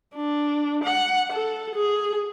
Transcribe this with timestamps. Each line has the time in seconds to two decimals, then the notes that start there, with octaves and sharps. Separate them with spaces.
0.16 D4
0.84 F#5
1.32 A4
1.75 G#4